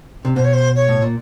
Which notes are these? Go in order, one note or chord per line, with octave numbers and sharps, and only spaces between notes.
C3
B2 C5
C#5
C5
C#5
A2
A#2